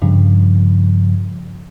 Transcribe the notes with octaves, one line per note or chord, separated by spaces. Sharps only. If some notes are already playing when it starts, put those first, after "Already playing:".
G2 C#3 F3